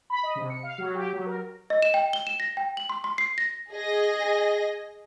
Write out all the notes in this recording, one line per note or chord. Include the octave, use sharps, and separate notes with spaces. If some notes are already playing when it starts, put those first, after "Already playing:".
B5
D#5
C3
C#7
F5
F#3
G4
F#3
A#4
D#5
E7
G5
G7
E7
A#6
G5
F#7
C6
C6
C7
A#6
G#4 D#5 A#6